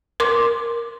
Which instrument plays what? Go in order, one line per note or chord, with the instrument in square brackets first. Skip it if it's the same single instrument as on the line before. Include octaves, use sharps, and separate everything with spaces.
[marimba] A#4 C6 D6